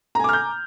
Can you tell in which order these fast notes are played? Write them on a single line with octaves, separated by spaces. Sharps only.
A#5 G#5 D6 F6 G6